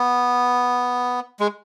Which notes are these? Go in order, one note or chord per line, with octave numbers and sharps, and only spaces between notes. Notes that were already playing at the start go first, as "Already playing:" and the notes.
Already playing: B3
G#3